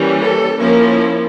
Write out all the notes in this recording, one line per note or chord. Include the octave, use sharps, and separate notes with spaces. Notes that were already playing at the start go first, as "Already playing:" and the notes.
Already playing: E3 G3 A#3 C#4
A4
F3 A#3 C#4 E4 A#4